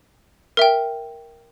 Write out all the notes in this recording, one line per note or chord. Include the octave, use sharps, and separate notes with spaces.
A#4 E5 G5